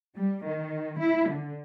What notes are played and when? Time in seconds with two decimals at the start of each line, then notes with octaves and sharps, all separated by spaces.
0.16 G3
0.45 D#3
0.99 E4
1.30 D3